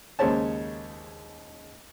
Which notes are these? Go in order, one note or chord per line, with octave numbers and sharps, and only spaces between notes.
D#2 C#3 G#3 C5 C#5 A5